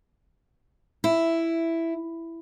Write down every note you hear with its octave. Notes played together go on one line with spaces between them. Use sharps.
E4